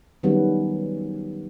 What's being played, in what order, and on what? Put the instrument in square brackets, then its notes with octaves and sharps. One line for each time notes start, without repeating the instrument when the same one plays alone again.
[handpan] D#3 F#3 G3 B3 C#4